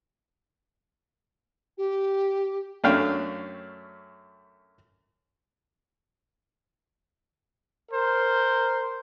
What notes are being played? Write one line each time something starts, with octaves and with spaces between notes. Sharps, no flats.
G4
F#2 A3 C#4 D4 F5 G5
A#4 C5